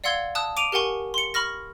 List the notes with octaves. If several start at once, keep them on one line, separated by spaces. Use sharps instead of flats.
D5 F5 F#5 C6 E6 G#6
A5 D#6 E6 F#6
D6 D7 D#7 F7
G4 A#4 F#5 G#5 C#6
C6 C#7
B5 C#6 F6 A#6